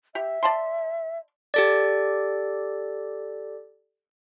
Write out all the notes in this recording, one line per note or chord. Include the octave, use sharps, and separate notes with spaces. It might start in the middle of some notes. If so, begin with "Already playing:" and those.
G4 E5
D5 A5 C6
G4 A4 D5